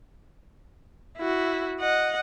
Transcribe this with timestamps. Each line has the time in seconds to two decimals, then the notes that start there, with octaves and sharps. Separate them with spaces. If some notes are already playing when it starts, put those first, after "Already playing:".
1.18 E4 F#4
1.80 D#5 F#5